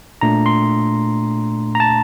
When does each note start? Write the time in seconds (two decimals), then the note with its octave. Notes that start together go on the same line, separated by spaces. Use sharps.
0.21 A#2 A3 D4 A#5
0.46 C6
1.75 A#5
1.80 A5